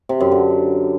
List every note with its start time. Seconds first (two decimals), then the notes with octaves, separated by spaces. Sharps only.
0.09 C3
0.20 F#2
0.32 D3